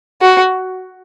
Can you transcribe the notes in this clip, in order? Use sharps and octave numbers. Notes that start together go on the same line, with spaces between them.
F#4